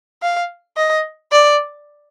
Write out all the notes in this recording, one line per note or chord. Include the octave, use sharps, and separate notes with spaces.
F5
D#5
D5